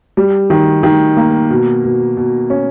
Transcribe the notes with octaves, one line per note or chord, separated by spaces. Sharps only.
G3
D#3
D#3
A#3
B2
B2
B2
C#4